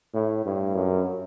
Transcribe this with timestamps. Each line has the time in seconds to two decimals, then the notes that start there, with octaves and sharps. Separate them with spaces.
0.14 A2
0.45 G2
0.75 F#2